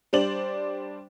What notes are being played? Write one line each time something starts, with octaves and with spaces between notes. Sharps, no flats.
G3 D4 C5 D5 F#7